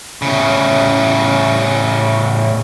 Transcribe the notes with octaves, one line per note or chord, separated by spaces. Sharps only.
A2 C#3